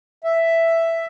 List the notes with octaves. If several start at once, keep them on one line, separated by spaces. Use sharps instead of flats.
E5